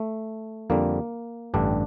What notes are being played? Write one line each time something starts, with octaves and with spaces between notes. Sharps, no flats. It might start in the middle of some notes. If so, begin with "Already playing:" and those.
Already playing: A3
F2 D3 G3 A#3
A1 G2 D3 G3 D4